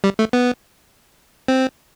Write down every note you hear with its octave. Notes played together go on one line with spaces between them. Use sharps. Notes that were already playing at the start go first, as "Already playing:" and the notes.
G3
A3
B3
C4